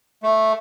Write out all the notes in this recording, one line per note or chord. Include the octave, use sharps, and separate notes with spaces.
A3